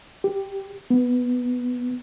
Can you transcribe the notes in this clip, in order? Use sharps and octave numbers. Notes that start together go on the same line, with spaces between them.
G4
B3